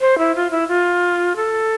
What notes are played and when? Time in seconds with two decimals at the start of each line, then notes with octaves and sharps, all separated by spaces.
0.01 C5
0.18 E4
0.35 F4
0.51 E4
0.68 F4
1.36 A4